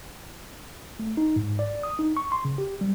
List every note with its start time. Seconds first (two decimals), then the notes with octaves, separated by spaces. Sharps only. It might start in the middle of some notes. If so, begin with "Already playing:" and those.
0.99 A3
1.17 D#4
1.36 G#2
1.59 D5
1.83 D#6
1.99 D#4
2.17 C#6
2.32 C6
2.45 C#3
2.58 G4
2.81 G3